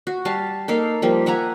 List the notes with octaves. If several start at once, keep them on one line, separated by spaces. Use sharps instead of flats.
F#4
G3 F5 A5
A#3 D#4 A4 F5
F3 G3 A#3
E5 F#5 G#5 A#5